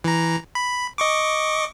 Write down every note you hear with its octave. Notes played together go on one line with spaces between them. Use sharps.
E3 A#5
B5
D#5 C#6 D6